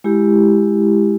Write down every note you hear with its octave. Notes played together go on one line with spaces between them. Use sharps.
G#3 E4 G4